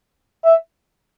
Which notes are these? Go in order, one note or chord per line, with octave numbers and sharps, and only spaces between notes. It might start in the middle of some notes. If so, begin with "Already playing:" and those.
E5